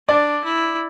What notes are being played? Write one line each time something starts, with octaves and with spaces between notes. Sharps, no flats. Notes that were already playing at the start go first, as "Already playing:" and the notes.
D4 D5
E4